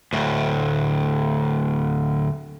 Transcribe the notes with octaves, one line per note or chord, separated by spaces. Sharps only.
D2 A2